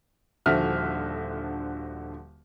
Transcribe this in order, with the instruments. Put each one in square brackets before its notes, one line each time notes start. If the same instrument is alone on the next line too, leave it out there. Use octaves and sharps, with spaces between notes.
[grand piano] D#1 D3 F3 F#4 E5 F6